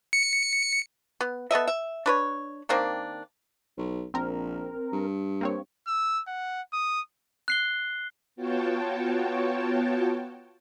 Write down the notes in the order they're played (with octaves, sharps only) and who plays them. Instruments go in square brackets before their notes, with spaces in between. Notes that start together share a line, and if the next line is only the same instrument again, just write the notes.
[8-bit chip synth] C#7
[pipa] B3
B3 A4 D#5 E5
E5
D4 B4 C#5
D#3 A#3 C4 D4
[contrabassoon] B1
[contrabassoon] A#1 [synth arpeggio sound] C4 A#4
[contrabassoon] G2
[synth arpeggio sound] A#3 C4 C#5
[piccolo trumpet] E6
F#5
D#6
[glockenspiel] F#6 C7 G7
[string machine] B3 F4 F#4 C#5 G5 A5